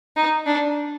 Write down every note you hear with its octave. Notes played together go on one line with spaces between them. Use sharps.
D#4
D4